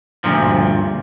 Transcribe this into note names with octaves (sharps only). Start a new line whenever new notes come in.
D2 G2 A#2 F3